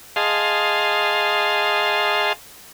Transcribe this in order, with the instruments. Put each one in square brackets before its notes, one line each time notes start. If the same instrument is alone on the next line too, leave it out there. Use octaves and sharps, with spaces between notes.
[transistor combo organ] G#4 D#5 F5 A5 C6